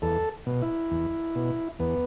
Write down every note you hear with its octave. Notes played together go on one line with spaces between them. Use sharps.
E2 A4
B2
E4
E2
B2
E2 B3